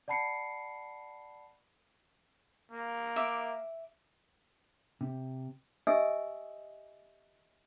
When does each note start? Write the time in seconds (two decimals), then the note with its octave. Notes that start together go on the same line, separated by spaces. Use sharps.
0.08 D5 F#5 A5 B5 C7 C#7
2.71 A#3
3.16 E5 D6
5.01 C3
5.87 G4 D#5 E5 G#5 D#6 E6